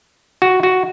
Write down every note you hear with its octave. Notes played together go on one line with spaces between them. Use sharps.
F#4
F#4